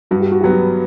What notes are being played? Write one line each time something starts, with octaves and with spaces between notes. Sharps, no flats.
G2 F#4
G4
F#4
F#3 B3 G4
F#4